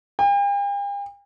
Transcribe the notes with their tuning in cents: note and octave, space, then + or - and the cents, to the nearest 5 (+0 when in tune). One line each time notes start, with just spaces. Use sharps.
G5 +45